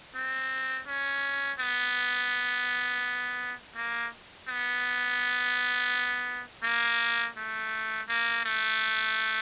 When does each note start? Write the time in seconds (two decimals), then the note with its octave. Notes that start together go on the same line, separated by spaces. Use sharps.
0.15 C4
0.88 C#4
1.60 B3
3.76 A#3
4.48 B3
6.64 A#3
7.37 A3
8.08 A#3
8.45 A3